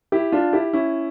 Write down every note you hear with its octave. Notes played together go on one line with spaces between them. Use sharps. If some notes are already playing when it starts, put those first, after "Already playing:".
E4 G4
D4 F4
E4 G4
C#4 E4